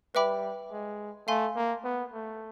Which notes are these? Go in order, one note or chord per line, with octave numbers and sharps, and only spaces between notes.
G3 B4 E5 G5 B5 D6
G#3
A3 F5 G#5 C6
A#3
B3
A3